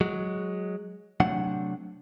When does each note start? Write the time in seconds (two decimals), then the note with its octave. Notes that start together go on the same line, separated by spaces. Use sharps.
0.01 F#3 G#3
1.20 C3 F#3 A3 D4 F#5